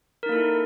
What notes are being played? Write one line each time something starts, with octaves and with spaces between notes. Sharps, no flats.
A#3 D#4 E4 A4 A#4